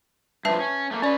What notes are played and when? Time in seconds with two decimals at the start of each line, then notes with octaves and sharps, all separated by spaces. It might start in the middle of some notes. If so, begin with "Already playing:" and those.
0.45 G2 F3 B4 E5 A5
0.60 C#4
0.91 A3 A#3
1.02 C#4 B4 C#5 D5